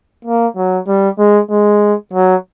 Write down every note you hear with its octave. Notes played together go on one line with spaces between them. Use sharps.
A#3
F#3
G3
G#3
G#3
F#3